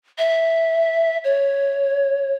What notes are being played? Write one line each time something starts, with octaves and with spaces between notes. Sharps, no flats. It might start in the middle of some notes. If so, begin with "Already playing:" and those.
E5
C#5